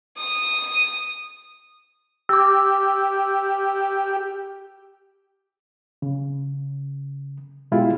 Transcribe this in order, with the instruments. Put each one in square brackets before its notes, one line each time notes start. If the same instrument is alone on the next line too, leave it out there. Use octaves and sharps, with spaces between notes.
[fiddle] D#6
[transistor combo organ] G4 [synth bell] D6 E6
[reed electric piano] C#3
B2 G#3 E4 F4 G4